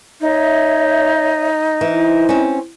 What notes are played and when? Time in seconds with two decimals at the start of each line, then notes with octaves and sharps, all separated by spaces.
0.21 D#4 C#5 E5
1.81 E3 C5
2.29 C4 C#4